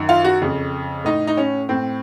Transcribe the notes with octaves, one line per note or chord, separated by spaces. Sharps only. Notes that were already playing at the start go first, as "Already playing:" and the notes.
Already playing: F#2 D#3
F4
F#4
F2 C#3
A2 D#4
D#4
C#4
A2 C4